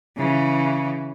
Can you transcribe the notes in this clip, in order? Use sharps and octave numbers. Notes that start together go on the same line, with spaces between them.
C#3 E3